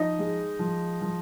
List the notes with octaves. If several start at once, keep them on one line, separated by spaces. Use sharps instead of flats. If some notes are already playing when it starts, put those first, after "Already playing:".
Already playing: F3 D#4 D#5
G#3
F3
F3